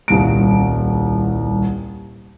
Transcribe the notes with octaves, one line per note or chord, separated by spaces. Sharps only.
D#1 C2 D7